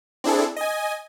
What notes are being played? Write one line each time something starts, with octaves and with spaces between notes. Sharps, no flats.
C4 D4 E4 G#4 A4
D#5 G#5